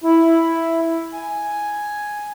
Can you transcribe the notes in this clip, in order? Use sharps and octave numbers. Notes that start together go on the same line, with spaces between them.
E4
G#5